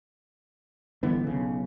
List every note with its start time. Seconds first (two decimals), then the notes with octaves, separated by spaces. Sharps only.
1.03 G1 D3 E3 B3
1.24 B1 C#3